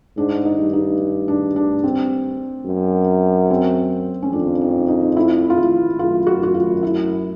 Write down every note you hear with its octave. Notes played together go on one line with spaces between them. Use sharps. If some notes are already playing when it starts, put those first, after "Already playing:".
G#2 D4
D#4
G2
D#4
D4
D4
C4
F#2
C4
C#4
F2 D4
D#4
D#4
E4
F4
E4
F#2 F4
F#4
F#4
F4
E4